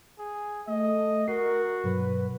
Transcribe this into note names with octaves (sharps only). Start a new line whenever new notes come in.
G#4
A3 D#5
F#4 A#4 C7
G2 B2 F#3 B4